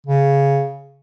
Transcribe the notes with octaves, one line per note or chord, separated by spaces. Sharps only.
C#3